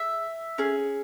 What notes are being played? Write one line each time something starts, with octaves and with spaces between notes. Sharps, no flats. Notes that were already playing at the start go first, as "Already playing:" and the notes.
Already playing: G#4 E5
C#4 G#4